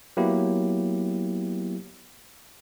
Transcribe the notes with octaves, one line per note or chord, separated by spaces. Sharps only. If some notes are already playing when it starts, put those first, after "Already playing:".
F#3 A#3 B3 E4 G4